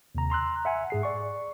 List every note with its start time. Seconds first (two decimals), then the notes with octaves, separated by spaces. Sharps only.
0.15 D#2 C3 A#5
0.30 A#5 C6 E6 F#6
0.65 E5 F#5 G#5
0.90 G#2 G#4 C7
1.03 D5 C#6